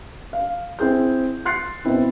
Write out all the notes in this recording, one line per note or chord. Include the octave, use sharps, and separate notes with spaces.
F5
C4 E4 G#4 G6
C6 F#6 A6 C7 C#7
B2 B3 C4 E4